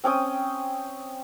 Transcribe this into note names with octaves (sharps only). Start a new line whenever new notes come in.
C4 C#4 G5 D#6